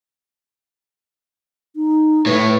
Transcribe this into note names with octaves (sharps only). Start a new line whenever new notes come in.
D#4
A2 A3 B4